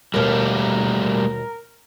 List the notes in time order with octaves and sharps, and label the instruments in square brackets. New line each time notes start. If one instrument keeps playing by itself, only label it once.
[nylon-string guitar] D#2 B2 [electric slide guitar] G3 A3 A#3 [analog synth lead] A#4